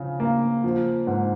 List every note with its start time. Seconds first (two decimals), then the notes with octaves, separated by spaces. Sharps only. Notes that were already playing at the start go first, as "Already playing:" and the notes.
Already playing: C#3 F3
0.20 A#3
0.64 F3
1.07 G#2